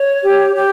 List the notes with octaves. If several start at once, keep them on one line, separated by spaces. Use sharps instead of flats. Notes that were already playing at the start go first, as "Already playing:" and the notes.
Already playing: C#5
G4
G4